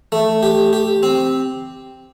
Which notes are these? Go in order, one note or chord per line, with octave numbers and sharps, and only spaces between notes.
A3
G4
G4
C4